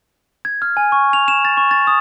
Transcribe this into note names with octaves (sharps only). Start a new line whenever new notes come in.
G#6
F6
G#5
C#6
F7
E7
A6
C#6
A6
D#6